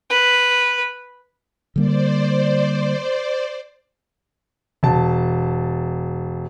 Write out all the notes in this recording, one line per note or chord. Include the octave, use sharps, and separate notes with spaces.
B4
D3 G3 A#3 C5 D5
E1 A5